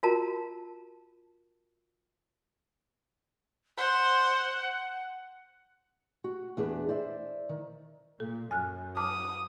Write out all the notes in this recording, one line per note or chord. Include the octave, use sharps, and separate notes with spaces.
F4 F#4 A#4 A5 A#5
C5 F#5
F#4
E2 D4 G#4 B4
C5 D5 E5
D#3
A#2 A4
F#2 G#5 F6 F#6
A5 D6 D#6 F6